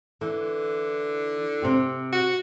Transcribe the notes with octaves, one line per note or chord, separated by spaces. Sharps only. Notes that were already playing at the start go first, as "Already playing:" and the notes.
D3 E3
C3 C4 G4
F#4